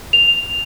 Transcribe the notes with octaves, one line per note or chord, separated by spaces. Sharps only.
F7